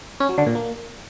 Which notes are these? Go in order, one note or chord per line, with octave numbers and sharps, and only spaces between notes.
C#4
F#3
D3
A#2
A#3